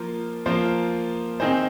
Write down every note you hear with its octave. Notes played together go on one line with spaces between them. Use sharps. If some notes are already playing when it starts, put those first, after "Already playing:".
Already playing: F3 A#3 F4 C5
F3 A#3 F4 C5
D#3 C4 D#4 G#4 C5